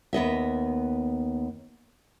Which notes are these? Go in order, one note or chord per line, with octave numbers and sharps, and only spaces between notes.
D#2 B3 D#5 E5